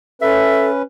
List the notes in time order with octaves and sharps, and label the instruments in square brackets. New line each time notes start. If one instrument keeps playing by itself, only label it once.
[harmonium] C#4 B4 [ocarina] A4 [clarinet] E5